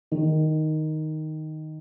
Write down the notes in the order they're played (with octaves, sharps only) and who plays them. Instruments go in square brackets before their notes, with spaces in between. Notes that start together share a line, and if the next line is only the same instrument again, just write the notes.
[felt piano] D#3